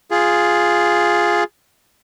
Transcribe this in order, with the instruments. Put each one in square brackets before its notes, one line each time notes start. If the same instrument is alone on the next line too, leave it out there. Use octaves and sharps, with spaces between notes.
[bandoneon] F4 G#4